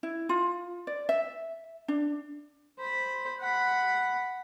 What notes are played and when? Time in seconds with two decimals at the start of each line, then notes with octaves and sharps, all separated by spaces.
0.03 E4
0.29 F4
0.87 D5
1.09 E5
1.88 D4
2.79 C5 B5
3.41 F#5 B5